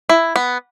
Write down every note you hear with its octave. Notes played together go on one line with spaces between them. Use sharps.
E4
B3